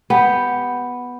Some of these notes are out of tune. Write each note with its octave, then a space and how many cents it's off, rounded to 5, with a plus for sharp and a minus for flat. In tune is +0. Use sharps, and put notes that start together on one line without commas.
B3 +0 G4 +0